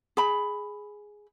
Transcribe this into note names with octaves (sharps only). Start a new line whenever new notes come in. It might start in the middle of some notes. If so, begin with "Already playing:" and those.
G#4 B5